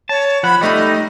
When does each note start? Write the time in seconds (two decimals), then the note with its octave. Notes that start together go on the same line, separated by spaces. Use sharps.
0.09 C#5 A5
0.43 F3 F#5 B5
0.61 G3 A3 D#4 D#5